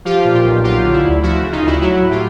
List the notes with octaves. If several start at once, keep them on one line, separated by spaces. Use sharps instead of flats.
F3 F4 G4
A#2
F4 G4
B1
F#3 F4 G4
D3
E4
D2
F3 E4 F#4
C#3
D#4 F4
D2 E4 F#4
F#3 E4 F#4
A2
F4 G4